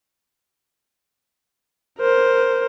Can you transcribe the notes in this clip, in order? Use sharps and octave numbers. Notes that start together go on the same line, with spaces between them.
A#4 C5